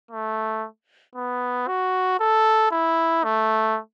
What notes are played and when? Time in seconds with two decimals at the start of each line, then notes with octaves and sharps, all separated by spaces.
0.11 A3
1.15 B3
1.68 F#4
2.20 A4
2.71 E4
3.24 A3